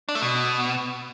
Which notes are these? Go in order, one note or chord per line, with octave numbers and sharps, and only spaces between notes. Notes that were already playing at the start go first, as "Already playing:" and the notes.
D4
A3
B2